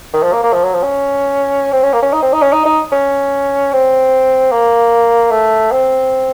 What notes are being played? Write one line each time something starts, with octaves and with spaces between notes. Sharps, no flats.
D#3
F3
A#3
A#3
F3
F#3
F3
C#4
C4
C#4
A#3
C#4
D#4
C4
D#4
C#4
D#4
D#4
C#4
C4
A#3
A3
C4